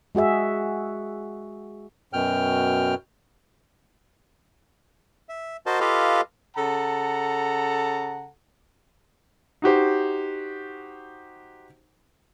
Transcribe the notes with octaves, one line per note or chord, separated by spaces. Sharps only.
G#3 F#4 G#4 E5
F#2 B2 G5 F6
E5
F#4 A#4 C5 D#5 A5
F4 G4 A4 B4 D#5 F5
C#3 A4 F#5 A5 A#5
D#4 F#4 G4 C5